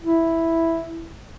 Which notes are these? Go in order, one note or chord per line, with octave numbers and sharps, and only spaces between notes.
E4